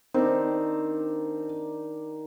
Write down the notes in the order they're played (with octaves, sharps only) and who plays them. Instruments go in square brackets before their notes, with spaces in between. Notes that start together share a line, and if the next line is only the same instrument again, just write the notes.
[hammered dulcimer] D#3 D4 [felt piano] C4